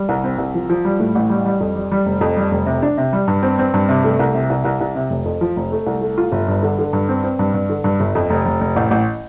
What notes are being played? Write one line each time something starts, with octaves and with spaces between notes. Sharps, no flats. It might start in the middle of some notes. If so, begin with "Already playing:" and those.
Already playing: G3
C2
C4
C2
F3
F3
G3
A2
A1
G3
G3
F2
G3
G3
F1
F2
G3
F1
C3
D4
C3
G3
G2
C4
C4
G2
C3
A3
C2
C3
C2
C2
C2
C3
F1
F2
F3
F1
A3
C2
A3
F4
G1
G2
D3
D3
G2
C4
C4
G2
G2
D3
G2
G1
F2
F1
F1
F1
A1
A1